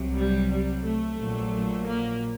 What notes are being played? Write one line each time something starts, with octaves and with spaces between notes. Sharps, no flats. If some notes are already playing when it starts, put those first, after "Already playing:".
Already playing: C2 C3 F#3
G3
G3
A3
A#1 A#2 F#3
A#3